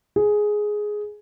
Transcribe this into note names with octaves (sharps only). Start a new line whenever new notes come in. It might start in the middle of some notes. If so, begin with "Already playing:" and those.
G#4